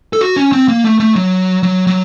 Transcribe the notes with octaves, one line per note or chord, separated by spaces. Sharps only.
A4
F#4
C#4
C4
A#3
A3
A3
F#3
F#3
F#3